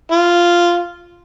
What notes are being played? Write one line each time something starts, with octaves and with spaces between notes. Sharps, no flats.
F4